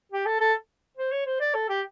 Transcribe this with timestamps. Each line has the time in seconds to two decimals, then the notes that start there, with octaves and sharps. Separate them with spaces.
0.12 G4
0.26 A4
0.41 A4
0.97 C5
1.12 C#5
1.26 C5
1.40 D5
1.54 A4
1.69 G4